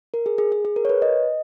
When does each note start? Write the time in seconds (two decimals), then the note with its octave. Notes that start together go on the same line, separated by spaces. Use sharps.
0.14 A#4
0.26 G#4
0.38 G#4
0.52 G#4
0.65 G#4
0.76 A#4
0.85 C#5
0.89 B4
1.02 D#5